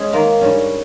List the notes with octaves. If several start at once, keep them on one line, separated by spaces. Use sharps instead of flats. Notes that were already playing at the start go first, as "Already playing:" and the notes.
Already playing: G#3 C#4 G#4
D#3 A#3 F4
G2 G3 C#4